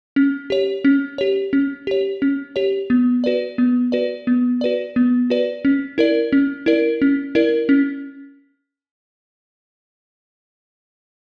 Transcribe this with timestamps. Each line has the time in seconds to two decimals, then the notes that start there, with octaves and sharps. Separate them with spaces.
0.16 C#4
0.50 G4 C#5
0.85 C#4
1.18 G4 C#5
1.53 C#4
1.87 G4 C#5
2.22 C#4
2.56 G4 C#5
2.90 B3
3.24 F#4 B4 D5
3.58 B3
3.92 F#4 B4 D5
4.27 B3
4.61 F#4 B4 D5
4.96 B3
5.30 F#4 B4 D5
5.65 C#4
5.98 E4 A#4 D5
6.32 C#4
6.66 E4 A#4 D5
7.02 C#4
7.35 E4 A#4 D5
7.69 C#4